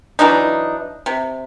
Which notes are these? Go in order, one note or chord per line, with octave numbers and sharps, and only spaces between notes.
E3 F#3 D4 D#4
C3